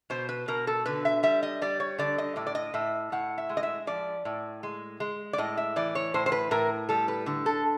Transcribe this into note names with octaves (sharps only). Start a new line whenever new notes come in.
B2 C5
B4
B2 A#4
A4
D3 B4
E5
G3 E5
D#5
G3 D5
C#5
D3 D5
D#5
A2 D5
D5
D#5
A2 E5
A2 F#5
E5
G#3
D#5
E5
F3 D5
A2
G#3
G#3
D5
A2 D#5
E5
E3 D5
C#5
A2 C5
C5
B4
A2 A#4
G3 A4
B4
D3
A4